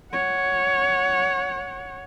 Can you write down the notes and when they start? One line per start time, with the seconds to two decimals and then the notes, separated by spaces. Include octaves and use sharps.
0.13 C#5 F#5